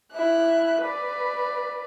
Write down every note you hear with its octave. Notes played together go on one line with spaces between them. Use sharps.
E4 F#6
B4 D5